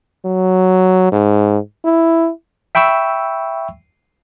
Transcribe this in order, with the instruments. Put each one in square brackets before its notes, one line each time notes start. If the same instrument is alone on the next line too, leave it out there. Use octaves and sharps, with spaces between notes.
[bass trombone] F#3
G#2
E4
[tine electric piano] E5 G5 B5 C#6 E6